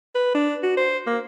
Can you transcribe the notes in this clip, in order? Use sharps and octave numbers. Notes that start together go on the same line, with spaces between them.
B4
D4
F#4
C5
A#3